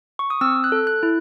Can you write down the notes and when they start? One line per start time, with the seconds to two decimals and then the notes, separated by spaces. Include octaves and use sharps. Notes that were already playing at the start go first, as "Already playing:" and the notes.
0.19 C#6
0.30 D#6
0.41 C4 E6
0.64 F#6
0.72 A4
0.87 F#6
1.03 E4